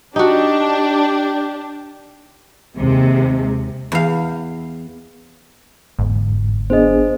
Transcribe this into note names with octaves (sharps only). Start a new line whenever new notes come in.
D4 D#4 F#4 G4
D#2 C3 G#3
E2 F5
G1 E2 G#2
B3 D4 G#4 C5 D#5